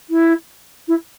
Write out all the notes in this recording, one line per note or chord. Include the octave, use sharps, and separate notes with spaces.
E4
E4